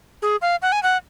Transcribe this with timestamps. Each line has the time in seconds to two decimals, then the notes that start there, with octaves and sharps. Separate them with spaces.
0.22 G#4
0.42 F5
0.62 F#5
0.72 G#5
0.83 F#5